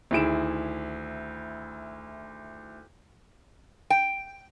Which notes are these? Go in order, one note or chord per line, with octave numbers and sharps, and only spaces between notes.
D2 D#3 E4 G#4 D7 E7
G5